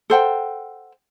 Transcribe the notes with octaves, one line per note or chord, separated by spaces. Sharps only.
A4 C5 F#5 G5